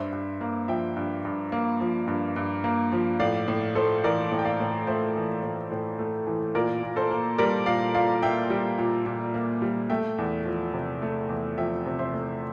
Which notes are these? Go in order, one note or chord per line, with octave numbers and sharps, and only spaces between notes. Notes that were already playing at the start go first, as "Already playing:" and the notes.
Already playing: G2 C5 E5
G2
A#3
F3 E5 G5
G2
G2
A#3
F3
G2
G2
A#3
F3
A2 D5 F5
A2
A3 A4 C5
E3 A#4 D5
A2
G5
D5 F5
A2
A3 C5 E5
E3
A2
A2
A3
E3
A#2 A#4 D5
A#2
A4 C5
A#3
G3 A#4 D5
A#2 D5 F5
A#2 D5 F5
A#3 E5 G5
G3
A#2
A#2
A#3
G3
A3 E5 G5
E2
F3
C3
A3
E2
F3 E5 G5
C3
C5 E5
A3